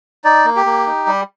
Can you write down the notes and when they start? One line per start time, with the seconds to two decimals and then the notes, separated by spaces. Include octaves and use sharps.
0.24 D#4 D5
0.45 A#3
0.56 G4
0.66 A#3
0.86 D#4
1.07 G3